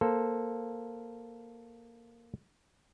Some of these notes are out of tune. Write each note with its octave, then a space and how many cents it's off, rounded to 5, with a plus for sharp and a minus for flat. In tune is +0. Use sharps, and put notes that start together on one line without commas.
A#3 +0 A4 +0 C5 +0